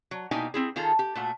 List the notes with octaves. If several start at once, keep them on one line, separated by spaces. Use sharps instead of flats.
F#3
B2 A#3 D#4 E4 G5 G#5
C4 E4 G#4
D#3 F4 G#4 A4 A#5
G4
A#2 A3 F#4